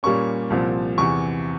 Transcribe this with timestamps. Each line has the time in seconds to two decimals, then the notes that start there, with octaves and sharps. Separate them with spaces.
0.03 A#2 G3 A#3 C#4 C#6
0.50 C2 A#2 F3 C4
0.98 E2 C3 E3 C#6